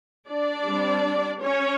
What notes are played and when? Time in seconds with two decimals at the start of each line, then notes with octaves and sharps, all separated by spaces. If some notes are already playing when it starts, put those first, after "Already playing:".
0.28 D4 D5
0.66 G3 C4
1.42 C#4 C#5